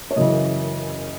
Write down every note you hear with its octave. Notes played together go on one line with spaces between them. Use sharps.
C#5
F#1 F#2 C#3 E3 D#5